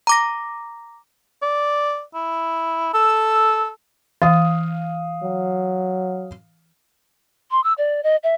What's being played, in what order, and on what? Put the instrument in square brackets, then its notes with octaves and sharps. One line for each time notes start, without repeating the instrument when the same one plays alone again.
[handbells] A#5 D6 A#6
[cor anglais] D5
E4
[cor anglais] A4 [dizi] E6
[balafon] E3 [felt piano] F5 D#6
[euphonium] F#3
[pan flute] C6
E6
D5
D#5
E5